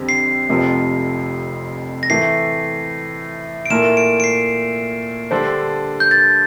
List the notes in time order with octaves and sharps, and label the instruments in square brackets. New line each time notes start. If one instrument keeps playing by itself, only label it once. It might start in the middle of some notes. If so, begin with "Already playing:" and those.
Already playing: [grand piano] F2 D3 G3 C4 G4
[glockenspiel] C7
[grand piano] F1 F2 C3 F3
[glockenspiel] A#6
[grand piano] A2 E3 A3 [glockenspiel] C7
[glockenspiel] D7
[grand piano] A#2 A3 E4 A#4 [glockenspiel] E7
[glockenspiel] D7
D7
C7
[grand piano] D3 G3 D4 A4 C5
[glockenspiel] G6
A6